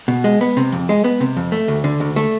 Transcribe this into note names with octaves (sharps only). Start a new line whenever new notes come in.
B2
G#3
B3
C3
F2
G#3
B3
C3
F2
A3
D2
D3
D2
A3